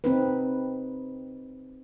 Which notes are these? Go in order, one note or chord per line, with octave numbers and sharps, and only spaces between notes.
C4 D#4 B4